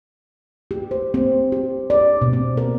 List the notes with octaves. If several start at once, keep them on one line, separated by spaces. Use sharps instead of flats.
G4
C5
C4
G4
D5
B2
C4
A#4